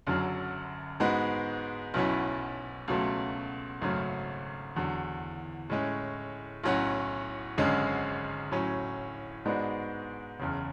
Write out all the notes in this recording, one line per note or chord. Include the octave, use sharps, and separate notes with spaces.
F#1 F#2 D3 F#3
G#2 G#3 B3 F#4
B1 B2 F#3 C#4 E4
C#2 B2 F#3 A3
G#1 F#2 C#3 F#3 A3
E2 D3 F#3
A2 G#3 C#4
B1 A2 F#3 C#4 F#4
G#1 F#2 D3 G#3 C#4
A2 F#3 C#4
G#2 G#3 B3 D4 F#4
F#1 E2 C#3